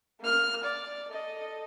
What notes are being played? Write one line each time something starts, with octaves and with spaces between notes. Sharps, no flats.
A#3 F6
D5
A4 D#5